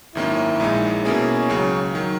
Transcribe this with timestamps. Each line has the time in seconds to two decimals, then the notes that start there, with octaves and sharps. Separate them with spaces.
0.15 G#1 F#2 D#3 A#3 C#4 E4
0.60 A#1 A#2 G#3 D#4
1.04 B2 A#3 C#4 E4 G#4
1.50 C#2 C#3 F#3
1.95 D#3 F#3